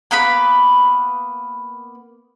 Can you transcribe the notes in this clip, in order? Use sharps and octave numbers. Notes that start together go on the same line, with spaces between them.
A#3 B3 B4 B5